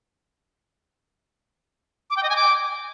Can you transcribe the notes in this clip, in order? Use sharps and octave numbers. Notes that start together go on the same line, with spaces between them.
D6
G5
D#5
G#5
D6